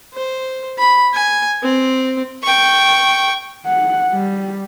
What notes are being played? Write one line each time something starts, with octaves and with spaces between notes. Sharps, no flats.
C5
B5
G#5
C4
G5 C#6
F#5
G3